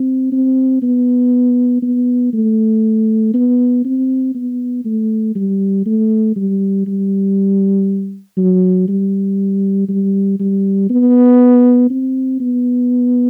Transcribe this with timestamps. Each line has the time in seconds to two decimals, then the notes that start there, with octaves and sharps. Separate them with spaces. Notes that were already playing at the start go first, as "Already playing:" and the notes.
Already playing: C4
0.32 C4
0.82 B3
1.83 B3
2.33 A3
3.34 B3
3.85 C4
4.35 B3
4.85 A3
5.35 G3
5.86 A3
6.36 G3
6.87 G3
8.37 F#3
8.88 G3
9.88 G3
10.40 G3
10.90 B3
11.90 C4
12.40 B3